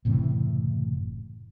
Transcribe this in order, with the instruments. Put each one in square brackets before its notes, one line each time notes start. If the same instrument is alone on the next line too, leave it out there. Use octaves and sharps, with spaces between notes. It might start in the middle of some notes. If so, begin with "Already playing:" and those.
[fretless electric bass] F#1 A2 C3 E3